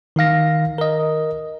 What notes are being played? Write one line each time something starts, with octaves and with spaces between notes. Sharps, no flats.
D#3 D#4 F5 A#6
A#4 D#5